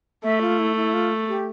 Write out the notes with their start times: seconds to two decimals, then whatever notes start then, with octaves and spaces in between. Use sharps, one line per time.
0.24 A3 E5
0.41 F4
0.59 E4
0.76 E4
0.93 F4
1.29 G4